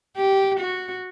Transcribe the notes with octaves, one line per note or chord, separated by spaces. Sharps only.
G4
F#4